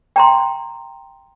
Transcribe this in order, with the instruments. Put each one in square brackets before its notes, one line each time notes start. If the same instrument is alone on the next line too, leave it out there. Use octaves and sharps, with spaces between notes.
[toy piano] G5 A#5 C6